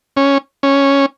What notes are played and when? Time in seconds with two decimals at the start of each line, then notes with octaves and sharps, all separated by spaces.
0.17 C#4
0.63 C#4